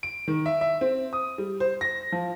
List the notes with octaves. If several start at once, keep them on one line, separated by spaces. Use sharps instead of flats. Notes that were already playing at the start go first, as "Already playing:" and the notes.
D7
D#3
E5
E5
C4
D#6
G3
C5
A#6
F3